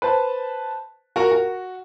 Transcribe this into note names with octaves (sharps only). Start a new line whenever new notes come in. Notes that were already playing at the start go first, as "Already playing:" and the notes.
B4 C5 A5
F#4 A#4 A#5 C#6
F#4